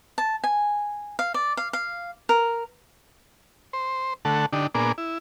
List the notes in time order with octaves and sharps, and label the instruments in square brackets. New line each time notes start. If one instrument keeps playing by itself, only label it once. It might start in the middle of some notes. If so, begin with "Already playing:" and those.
[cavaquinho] A5
G#5
F5
D5
F5
F5
A#4
[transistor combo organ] C5
D3 A3 A4 F#5
D3 D4 D#4 G4
A#2 A#3 B3 D4 G#4 D6
E4